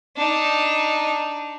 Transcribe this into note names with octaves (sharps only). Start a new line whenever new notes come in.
D4 D#4